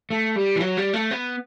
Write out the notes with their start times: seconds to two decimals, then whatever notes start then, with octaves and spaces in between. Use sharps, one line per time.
0.10 A3
0.36 G3
0.56 E3
0.61 F#3
0.77 G3
0.93 A3
1.11 B3